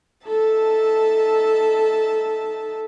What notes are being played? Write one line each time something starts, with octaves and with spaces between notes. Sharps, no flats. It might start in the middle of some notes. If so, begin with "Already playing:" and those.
D#4 A4 E5 A5